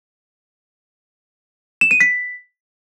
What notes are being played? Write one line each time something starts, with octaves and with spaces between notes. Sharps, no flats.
E7
D#7
B6